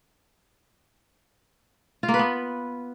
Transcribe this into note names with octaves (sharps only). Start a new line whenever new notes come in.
F4
A#3
B4
B3